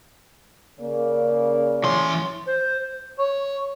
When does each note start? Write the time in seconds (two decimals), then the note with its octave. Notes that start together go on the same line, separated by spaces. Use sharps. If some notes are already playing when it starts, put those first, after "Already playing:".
0.79 C#3 A#3 D5
1.84 E3 C#4 C6
2.47 C5
3.19 C#5